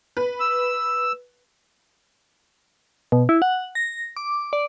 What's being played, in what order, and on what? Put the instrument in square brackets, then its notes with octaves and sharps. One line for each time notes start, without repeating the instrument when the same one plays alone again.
[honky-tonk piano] B4
[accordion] E6
[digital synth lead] B2
E4
F#5
A#6
D6
D5